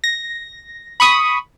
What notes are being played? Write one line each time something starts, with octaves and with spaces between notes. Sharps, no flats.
A#6
B5 C#6 D#6